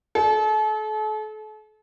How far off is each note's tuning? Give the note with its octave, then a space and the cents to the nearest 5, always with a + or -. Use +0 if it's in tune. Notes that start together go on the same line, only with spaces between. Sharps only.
A4 -40